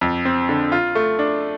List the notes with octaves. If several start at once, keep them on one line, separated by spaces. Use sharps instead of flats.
F2
C4
D3
F4
A3
D4